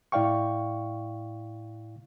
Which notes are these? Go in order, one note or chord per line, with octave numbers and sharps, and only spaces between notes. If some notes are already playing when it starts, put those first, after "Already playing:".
A2 E4 D5 F5 G5 C#6